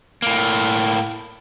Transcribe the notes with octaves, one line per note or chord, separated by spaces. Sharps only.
A2 A#3